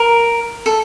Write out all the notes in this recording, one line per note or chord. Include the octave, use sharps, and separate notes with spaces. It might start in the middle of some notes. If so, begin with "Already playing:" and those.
Already playing: A#4
A4